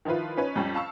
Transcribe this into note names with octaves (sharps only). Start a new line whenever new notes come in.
D#3 F3 E4 F4 B4
C#4 D#4 B4 C#5
F2 G3 C#4
F5 A5 C#6 E6